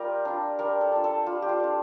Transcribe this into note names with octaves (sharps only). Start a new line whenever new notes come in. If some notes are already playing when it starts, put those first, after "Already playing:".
Already playing: G3 F4 G4 A#4
D4 F4
G3 A#4
A4
D4 F4
A4
G3 F4
G4
F4
D4 F4